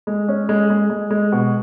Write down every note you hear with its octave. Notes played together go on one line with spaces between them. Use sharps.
G#3
C#4
G#3
G#3
G#3
G#3
B2